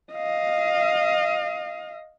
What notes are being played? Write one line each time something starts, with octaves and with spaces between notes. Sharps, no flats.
D#5 F5